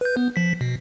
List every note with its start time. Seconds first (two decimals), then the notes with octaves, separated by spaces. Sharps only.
0.01 B4 G6
0.17 B3
0.36 F3 B6
0.61 B2